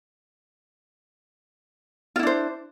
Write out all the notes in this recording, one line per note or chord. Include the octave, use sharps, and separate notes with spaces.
D4 E4 F4 C5